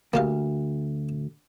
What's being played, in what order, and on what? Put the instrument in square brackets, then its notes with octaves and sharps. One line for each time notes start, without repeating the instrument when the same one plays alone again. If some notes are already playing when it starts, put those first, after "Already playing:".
[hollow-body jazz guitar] D2 [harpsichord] A#3 G4 F5